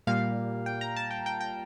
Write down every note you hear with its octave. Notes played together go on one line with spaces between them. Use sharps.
A#2 G3 A#3 F5
G5
A#5
A5
G5
G5
G5